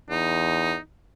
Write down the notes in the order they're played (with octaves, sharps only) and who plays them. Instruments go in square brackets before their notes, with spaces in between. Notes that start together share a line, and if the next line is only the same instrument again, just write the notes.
[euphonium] E2 [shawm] D#4